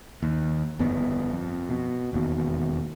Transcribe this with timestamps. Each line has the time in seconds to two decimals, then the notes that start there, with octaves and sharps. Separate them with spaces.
0.22 D#2
0.79 G1 F2 B3
1.32 F2
1.69 B2
2.13 E1 D#2 B2